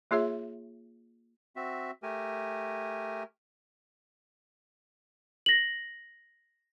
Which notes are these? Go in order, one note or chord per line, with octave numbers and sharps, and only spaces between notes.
A#3 F4 G#4 C#5 E5
C4 F#4 E5
A3 G4 A#4 G#5
A#6 F#7